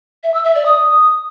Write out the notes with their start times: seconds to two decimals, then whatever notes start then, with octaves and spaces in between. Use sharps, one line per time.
0.23 E5
0.34 E6
0.45 E5
0.55 D5
0.66 D#6